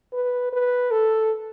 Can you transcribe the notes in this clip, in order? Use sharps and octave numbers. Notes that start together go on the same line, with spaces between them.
B4
B4
A4